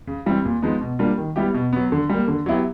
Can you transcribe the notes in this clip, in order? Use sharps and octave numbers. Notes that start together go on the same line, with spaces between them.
C#3
E3 G3 C4
A#2
F3 G#3 B3 D#4
B2
G3 A#3 D4 F4
D#3
G3 B3 E4 G4
B2
F#3 B3
D3
G3 A#3
D3
F#3 B3 E4 G4